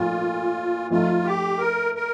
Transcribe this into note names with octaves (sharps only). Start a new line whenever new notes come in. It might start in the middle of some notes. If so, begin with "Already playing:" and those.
Already playing: A#2 F3 A3 D#4 F4
F3 A3 D#4 F4 A4
G4
A#4
A#4